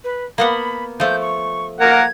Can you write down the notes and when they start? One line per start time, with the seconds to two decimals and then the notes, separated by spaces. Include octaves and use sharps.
0.04 B4
0.38 A#3 B3 F#5 B5
1.00 F3 A3 G6
1.21 C#6
1.80 A#3 A#4 F#5 G#6